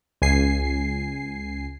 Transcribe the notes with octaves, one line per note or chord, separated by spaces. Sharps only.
C#2 G#5 C7